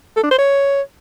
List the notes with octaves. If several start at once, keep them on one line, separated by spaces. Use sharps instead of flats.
A4
D4
C5
C#5